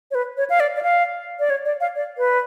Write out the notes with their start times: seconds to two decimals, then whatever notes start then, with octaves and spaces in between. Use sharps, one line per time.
0.11 C#5
0.15 B4
0.37 C#5
0.50 F5
0.60 D5
0.76 D5
0.83 F5
1.39 D5
1.50 C#5
1.65 D5
1.80 F5
1.96 D5
2.18 B4